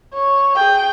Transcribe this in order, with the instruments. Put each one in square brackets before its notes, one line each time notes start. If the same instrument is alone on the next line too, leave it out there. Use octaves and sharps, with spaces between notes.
[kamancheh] C#5
G#4 G5